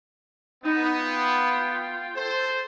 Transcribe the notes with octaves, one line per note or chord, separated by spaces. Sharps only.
B3 D#4
F4 G5
A4 C5